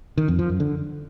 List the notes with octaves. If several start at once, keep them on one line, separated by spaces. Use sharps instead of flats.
D#3
F2
F3
F#2
D3